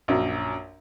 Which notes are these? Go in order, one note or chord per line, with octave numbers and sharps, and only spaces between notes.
A#1 F#2